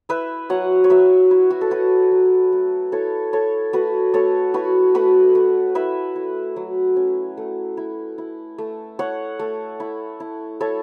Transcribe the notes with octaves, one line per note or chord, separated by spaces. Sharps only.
E4 B4 E5
F#3 C#5 F#5
C#5
F#3 B4 E5
E4
F#4
A4
E4 F#4 B4
F#3
A3
E4 A4 C#5
E4 A4 C#5
A3 F#4 B4
A3 A4 C#5
E4 F#4 B4
A3 F#4 B4
A3
E4 B4 E5
E4
F#3
C#4
A3
E4
E4
A3
E4 C#5 F#5
A3
E4
E4
E4 A4 C#5